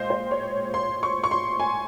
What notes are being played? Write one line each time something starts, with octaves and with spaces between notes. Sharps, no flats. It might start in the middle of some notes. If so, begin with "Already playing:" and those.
Already playing: A#2 G#3 C5 D#5 F5 G5
C5
C#5
C6
C#6
C#6
C6
G#5